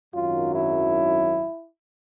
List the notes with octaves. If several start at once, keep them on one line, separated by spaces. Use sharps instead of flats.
G#1 F#2 D#3 F#3 F4
E4